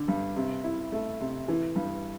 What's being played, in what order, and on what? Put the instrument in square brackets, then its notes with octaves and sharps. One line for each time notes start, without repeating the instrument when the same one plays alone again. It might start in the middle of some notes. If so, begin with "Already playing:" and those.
Already playing: [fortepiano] D3
G2
C3
E4
A3
C3
E3
G2